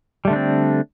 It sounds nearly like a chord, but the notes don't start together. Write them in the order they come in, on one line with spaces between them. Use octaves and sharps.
G3 A3 D3 D4 C4